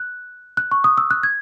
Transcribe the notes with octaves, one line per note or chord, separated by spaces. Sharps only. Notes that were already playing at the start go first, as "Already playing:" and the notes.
Already playing: F#6
F#6
C#6
D#6
E6
F#6
G#6